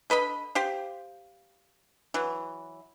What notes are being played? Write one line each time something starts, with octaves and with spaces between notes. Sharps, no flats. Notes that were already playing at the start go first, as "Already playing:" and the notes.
D3 B4 D#5 B5
G4 C5 F5
E3 F#3